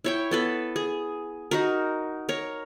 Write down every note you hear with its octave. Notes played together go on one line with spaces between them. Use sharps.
E4 C#5 G5
B3 A4 B4
G#4
D#4 F#4 A#4
A#4 C#5